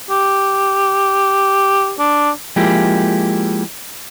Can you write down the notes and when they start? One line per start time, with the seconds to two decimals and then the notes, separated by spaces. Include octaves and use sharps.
0.10 G4
1.99 D4
2.56 F3 G#3 A#3 E4 G4